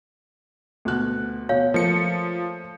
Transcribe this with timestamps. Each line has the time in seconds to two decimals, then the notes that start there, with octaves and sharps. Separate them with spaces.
0.85 D2 B2 F#6
1.49 B2 C#5 F5
1.74 F3 A3 A#3 A#4 C#7